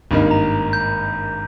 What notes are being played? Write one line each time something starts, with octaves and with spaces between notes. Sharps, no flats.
G#1 G2 D#3 A#3 D#4
A#5
G6